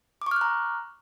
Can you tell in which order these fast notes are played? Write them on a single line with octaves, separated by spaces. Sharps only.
D6 C#6 F6 F#6 A#5